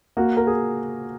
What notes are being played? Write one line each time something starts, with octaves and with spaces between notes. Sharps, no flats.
A#3 F#4
A#4
G#4